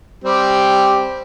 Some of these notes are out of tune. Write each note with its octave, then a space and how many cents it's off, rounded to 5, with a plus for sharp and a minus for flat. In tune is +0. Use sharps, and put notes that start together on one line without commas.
G3 +0 C4 +0 G4 +0